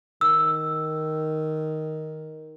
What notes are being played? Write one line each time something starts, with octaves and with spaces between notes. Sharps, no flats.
D#3 E6